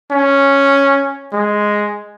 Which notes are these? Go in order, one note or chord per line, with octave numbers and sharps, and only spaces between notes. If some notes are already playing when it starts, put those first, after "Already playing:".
C#4
G#3